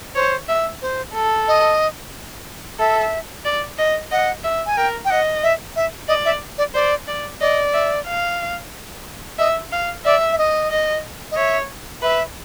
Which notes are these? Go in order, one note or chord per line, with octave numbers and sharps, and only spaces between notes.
C5 C#5
E5
C5
A4
D#5
A4 E5
D5
D#5
D#5 F#5
E5
G#5
A#4 G5
G5
D#5 F#5
E5
E5
D5 D#5
E5
D5
C5 D5
D5
D5 D#5
E5
F5
D#5 E5
F5
D5 E5
E5
D#5
D#5
D#5
C#5 E5
B4 E5